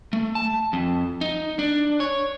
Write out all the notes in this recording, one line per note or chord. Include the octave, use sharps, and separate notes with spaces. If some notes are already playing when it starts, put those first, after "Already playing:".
A3
A5
F2
D#4
D4
C#5